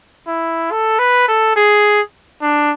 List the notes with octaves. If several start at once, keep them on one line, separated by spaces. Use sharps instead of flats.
E4
A4
B4
A4
G#4
D4